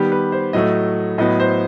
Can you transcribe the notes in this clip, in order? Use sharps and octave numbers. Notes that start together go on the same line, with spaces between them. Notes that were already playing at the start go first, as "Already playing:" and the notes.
Already playing: D#3 G3 B3 G4
B4
C5
A2 F#3 A3 D#5
A2 F#3 B3 D#5
C5